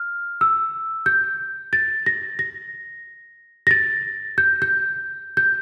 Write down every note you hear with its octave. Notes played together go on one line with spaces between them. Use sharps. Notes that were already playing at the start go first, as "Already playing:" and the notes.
Already playing: F6
E6
G6
A6
A#6
A#6
A#6
A6
G6
G6
G6